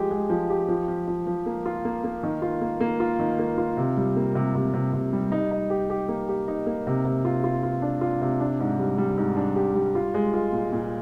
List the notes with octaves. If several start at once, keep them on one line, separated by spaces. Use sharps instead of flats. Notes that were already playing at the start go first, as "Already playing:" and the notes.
Already playing: F3 G#3 G4
G#3
F3
G4
F3
F3
F3
F3
A#3
F4
A#3
A#3
D#3
F4
A#3
A#3
F4
D#3
A#3
F4
C3
G3
A#3
C3
C3
C3
C3
G3
D#4
D#4
G4
G4
A#3
G4
D#4
A#3
C3
C3
F4
F4
F4
D4
F4
C3
D4
G#2
G3
G3
G#2
D4
G4
G3
F4
G#3
F4
A#2
A#2